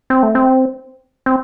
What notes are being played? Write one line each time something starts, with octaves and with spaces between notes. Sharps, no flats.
C4
A3
C4
C4